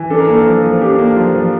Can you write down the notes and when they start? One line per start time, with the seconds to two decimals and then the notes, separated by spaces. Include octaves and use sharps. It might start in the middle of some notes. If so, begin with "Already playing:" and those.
Already playing: E3
0.10 D4 A4
0.19 A#4
0.28 A#3 A4
0.46 F3
0.63 F3
0.82 D4 G4
0.99 A#3
1.16 F3 F4
1.35 F3